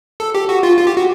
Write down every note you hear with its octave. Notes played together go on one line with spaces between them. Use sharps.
A4
G4
F#4
F4
F4
G4
F#4